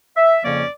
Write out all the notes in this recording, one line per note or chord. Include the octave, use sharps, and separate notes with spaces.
E5
F2 C#3 F3 A#3 C#4 D5